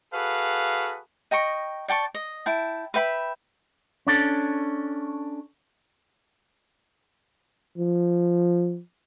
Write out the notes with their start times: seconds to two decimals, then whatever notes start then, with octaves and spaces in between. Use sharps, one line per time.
0.13 F#4 G#4 A4 B4 F5
1.31 D#5 G5 A#5 C#6
1.88 D5 G5 A5 C#6
2.14 D#5
2.46 E4 G5 A5
2.94 B4 E5 G5 B5
4.07 C#4 D4 A4
7.78 F3